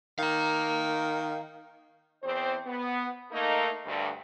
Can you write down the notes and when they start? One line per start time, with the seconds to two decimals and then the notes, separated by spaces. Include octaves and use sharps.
0.19 D#3 F5 A#5
2.23 E2 C4 C5
2.66 B3
3.31 A3 A#3 D#4
3.85 D2 G2